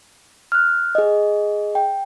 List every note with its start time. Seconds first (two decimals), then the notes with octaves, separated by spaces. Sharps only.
0.52 F6 F#6
0.95 G#4 D#5
1.75 G5